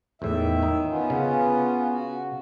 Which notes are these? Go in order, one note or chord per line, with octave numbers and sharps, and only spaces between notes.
E2 A2 D#3 E5
D#4
B3 C#4 F4
C#3
F#4